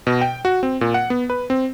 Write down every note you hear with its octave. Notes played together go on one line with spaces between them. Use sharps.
B2
G5
F#4
C4
A#2
F#5
B3
B4
C4